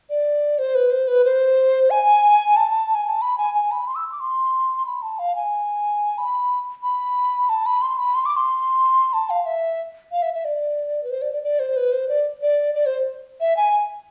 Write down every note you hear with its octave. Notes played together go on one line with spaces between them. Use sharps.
D5
C5
B4
C5
B4
C5
G#5
A5
G#5
A5
B5
G#5
G#5
B5
C6
E6
D6
C6
B5
A5
F5
G#5
B5
B5
A5
B5
C6
B5
C6
D6
C6
A5
F5
E5
F5
E5
E5
D5
B4
C5
D5
D5
D5
C5
B4
C5
D5
D5
D5
C5
E5
G#5